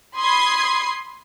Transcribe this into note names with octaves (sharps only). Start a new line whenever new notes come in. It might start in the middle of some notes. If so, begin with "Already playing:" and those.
B5 C6 D#6 G#6 C7